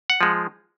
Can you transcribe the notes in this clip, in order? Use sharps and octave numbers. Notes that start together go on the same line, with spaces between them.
F#5
F3 G#3